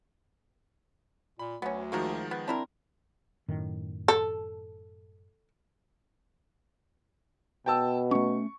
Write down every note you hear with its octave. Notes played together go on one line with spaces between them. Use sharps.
A#2 B5
D2 F#3 B3 C#4
D#3 F3 G#3 A#3 F#4 A#4
B3
C4 D4 E4 A#4
F#2 A2 D#3
A4
B2 G5 A5 E6
A3 C#4 C#6